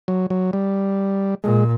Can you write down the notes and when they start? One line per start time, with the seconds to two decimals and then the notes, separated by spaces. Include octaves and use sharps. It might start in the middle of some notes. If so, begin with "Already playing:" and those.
0.08 F#3
0.30 F#3
0.53 G3
1.44 A#2 G#3